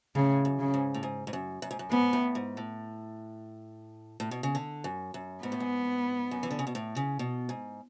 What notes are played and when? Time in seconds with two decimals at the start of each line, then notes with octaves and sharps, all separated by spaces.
0.15 A2 C#3
0.45 F#2
0.60 C#3
0.74 G#2
0.94 A2
1.03 G#2
1.27 G#2
1.33 F#2
1.62 F#2
1.71 G#2
1.79 F#2
1.91 G#2 B3
2.13 A2
2.35 G#2
2.57 A2
4.20 A2
4.31 B2
4.43 C#3
4.55 D3
4.84 F#2
5.14 F#2
5.43 G#2 B3
5.52 A2
5.60 G#2
6.31 F#2
6.43 E3
6.50 D3
6.59 C#3
6.67 B2
6.75 A2
6.96 C#3
7.19 B2
7.49 G#2